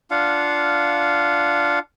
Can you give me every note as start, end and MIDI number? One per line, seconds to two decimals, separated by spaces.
0.11 1.79 62
0.11 1.79 65
0.11 1.79 77
0.11 1.79 78